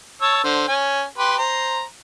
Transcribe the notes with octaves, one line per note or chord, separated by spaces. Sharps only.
C#5 A5 E6
D3 C5
C#4 G#5
G4 B4 C6
C5 A#5